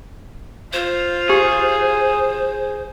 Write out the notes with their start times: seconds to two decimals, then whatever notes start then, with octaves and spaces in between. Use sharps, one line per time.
0.73 F4 C5
1.29 G4 G#4